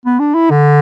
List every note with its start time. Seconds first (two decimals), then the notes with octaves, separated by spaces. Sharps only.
0.05 B3
0.19 D4
0.35 E4
0.50 D3